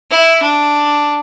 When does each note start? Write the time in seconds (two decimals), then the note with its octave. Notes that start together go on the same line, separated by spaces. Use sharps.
0.11 E4
0.43 D4